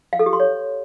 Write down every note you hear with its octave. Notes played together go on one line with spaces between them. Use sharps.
F5
A4
G4
C6
C#5